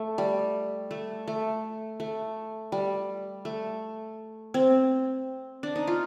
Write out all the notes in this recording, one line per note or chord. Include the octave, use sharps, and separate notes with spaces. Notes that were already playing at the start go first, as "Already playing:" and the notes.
Already playing: A3
G3
A3
A3
A3
G3
A3
C4
D4
D#4
F4